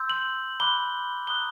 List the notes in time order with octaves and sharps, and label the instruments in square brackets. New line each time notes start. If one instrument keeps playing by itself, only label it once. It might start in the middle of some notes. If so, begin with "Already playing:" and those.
Already playing: [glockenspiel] C6 E6 G6
F#7
B5 D6 F#6 G7
A#5 D#6 F#6 G7